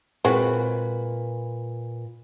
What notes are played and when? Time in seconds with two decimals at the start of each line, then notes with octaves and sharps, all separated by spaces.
0.25 A#2 G#3 C4 F#4 B4